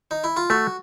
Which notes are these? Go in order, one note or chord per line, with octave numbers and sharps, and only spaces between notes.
D#4
E4
F4
A3 F#4